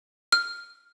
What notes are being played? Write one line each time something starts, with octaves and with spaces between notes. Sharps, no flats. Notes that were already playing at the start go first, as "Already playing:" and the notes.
F6